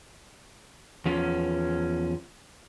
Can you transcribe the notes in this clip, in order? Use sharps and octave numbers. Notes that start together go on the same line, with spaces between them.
E2 F3 C#4